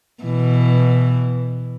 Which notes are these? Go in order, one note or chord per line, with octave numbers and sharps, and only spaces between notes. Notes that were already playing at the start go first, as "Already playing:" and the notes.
B2 E3